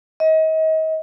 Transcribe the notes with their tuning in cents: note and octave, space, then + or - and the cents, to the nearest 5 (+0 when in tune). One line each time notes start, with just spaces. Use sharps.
D#5 +35